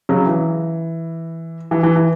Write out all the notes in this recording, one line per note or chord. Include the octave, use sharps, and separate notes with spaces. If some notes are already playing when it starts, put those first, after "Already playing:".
C#3 F#3
E3
E3
E3
E3